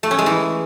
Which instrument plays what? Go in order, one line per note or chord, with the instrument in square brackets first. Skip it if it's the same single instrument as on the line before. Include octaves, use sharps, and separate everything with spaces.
[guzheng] A3
C#4
G#3
E3